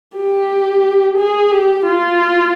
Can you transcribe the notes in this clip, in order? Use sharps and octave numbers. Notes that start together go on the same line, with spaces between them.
G4
G#4
G4
F4